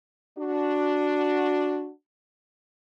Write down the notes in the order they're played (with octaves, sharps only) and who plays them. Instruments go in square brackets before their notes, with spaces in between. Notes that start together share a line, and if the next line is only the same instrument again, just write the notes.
[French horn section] D4 F#4